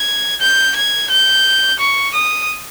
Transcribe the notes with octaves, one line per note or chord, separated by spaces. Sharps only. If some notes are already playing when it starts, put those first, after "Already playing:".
Already playing: G#6
G6
G#6
G6
C#6
D#6